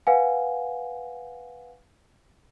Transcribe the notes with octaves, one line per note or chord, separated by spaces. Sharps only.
B4 F5 F#5 G#5